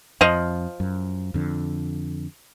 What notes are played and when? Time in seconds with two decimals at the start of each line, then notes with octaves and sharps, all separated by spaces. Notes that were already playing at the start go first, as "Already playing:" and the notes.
0.21 F2 F3 D#5 F5
0.80 F#2
1.34 F2 D3